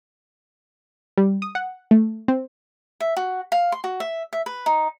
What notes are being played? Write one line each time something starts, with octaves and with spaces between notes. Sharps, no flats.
G3
D#6
F#5
A3
C4
E5
F#4
F5
C6
F#4
E5
E5
B4
D#4